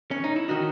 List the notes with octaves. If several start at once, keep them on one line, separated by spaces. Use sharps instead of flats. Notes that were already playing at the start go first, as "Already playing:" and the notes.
C#4
D#4
E4
D#3 D#4 F#4